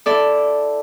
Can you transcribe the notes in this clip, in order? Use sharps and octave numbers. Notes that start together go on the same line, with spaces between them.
E4 A4 D5